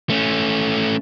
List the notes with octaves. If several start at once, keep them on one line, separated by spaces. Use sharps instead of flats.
A3 C#4